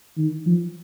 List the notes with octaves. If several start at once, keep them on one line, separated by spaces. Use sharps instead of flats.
D#3
F3